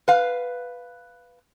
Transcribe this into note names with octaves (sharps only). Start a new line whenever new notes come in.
B4 F5